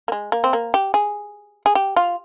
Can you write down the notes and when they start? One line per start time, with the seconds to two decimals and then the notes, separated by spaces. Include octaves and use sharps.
0.08 A#3
0.12 G#3
0.32 A#3
0.44 C4
0.53 A#3
0.74 G4
0.94 G#4
1.66 G#4
1.75 G4
1.96 F4